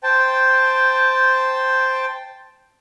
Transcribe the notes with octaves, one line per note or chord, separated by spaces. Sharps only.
C5 G5 A5